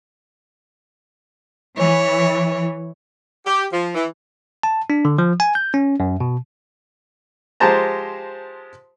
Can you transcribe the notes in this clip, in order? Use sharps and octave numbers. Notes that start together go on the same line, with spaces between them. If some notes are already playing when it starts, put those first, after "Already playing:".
E3 C#5
G4
F3
E3
A5
D4
D3
F3
G#5
G6
C#4
F#2
B2
F3 G#3 G4 C5 A5 A#5